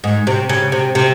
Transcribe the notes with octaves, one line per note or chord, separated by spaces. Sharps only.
G#2
C3
C#3
C3
C3